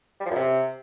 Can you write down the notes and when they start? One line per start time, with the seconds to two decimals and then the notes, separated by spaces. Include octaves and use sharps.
0.20 G3
0.25 F3
0.31 F#2
0.36 C3